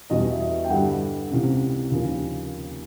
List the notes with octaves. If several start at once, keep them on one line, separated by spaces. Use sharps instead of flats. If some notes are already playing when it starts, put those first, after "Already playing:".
E2 B2 G3 D#5
E5
D#5
G5
G2 D3 G3 F#5
C#2 C3 E3
D#2 C#3 F3